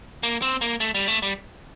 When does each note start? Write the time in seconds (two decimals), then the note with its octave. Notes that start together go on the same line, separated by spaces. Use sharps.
0.23 A#3
0.42 C4
0.61 A#3
0.80 A3
0.94 G3
1.08 A3
1.22 G3